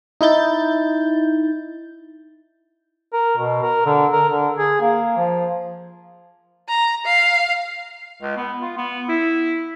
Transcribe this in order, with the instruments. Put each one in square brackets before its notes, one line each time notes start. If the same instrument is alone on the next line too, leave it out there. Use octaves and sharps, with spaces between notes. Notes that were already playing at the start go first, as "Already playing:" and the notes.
[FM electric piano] D#4 E4 G6 A6
[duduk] A#4
B2
A#4
D3
A#4
D3
G#4
A#3
F3
[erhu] A#5
F5
[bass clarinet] C#2
B3
F4
B3
E4